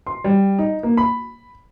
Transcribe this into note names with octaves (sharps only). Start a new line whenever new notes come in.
C6
G3
D#4
A#3
B5